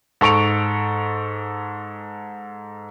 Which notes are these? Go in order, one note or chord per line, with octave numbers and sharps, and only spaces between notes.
G#2 A4 C#6 D7 F7